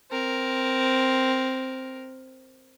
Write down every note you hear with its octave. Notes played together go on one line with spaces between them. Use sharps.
C4 A#4